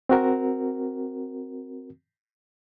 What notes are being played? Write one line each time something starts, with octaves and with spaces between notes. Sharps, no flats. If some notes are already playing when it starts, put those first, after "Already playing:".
C4 F#4 A#4